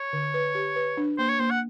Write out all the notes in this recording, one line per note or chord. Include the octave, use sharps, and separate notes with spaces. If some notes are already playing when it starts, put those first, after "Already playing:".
Already playing: C#5
D3
B4
G4
B4
D4
A#3 C5
C#5
A#3 C5
F#5